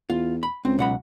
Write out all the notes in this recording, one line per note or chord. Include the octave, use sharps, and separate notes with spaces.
E2 F4
B5
C#2 C4
B1 F#5 B5